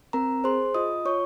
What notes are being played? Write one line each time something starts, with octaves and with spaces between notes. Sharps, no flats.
C4 A#4 A#5
G#4 C5 C6
F4 D#5 D#6
F4 C#5 C#6